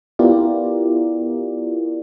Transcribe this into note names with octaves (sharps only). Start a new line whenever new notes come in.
B3 E4 F4 G4 A#4 D5